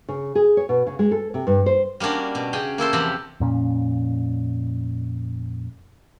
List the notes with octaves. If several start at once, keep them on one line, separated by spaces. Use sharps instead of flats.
C#3
G#4
C#5
B2
C#3
G#3
A4
C3
G2
C5
G3 A#3 C#4 D4 F#4
B2
C#3 C#4 G4 G#4 F#5 G5
A#3 E4 A4 C5
E2 C3 F3 G4 F#5 B5
F2 A#2 C#4